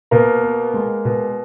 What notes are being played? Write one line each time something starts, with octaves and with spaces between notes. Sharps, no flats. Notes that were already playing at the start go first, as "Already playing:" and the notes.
B2 A#3 A#4
B3
G#3
B2